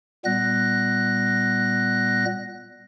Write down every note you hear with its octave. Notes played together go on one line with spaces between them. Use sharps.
A#2 G3 B3 F#6 A#6